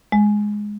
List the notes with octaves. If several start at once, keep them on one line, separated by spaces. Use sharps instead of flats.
G#3